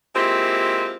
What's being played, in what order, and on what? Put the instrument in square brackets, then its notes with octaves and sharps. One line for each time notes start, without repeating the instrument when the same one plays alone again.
[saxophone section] G#3 A#3 C4 E4 F4 G4